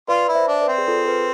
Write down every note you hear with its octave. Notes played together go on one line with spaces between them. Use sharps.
F4 B4 D5
E4
C5 E5
D4
B4 D5
C4
G#4
F4 A4
G#4 B4